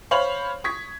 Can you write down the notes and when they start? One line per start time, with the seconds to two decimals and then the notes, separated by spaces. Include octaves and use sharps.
0.11 C5 C#5 F5 B5 F7 F#7
0.64 C#6 D#6 G#6 B6